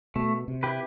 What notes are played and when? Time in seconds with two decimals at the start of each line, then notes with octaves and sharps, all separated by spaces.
0.16 B2 A3
0.48 C3
0.63 E4 G4 B4